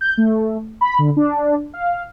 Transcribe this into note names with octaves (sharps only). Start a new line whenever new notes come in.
G6
A3
B5
D3
D4
F5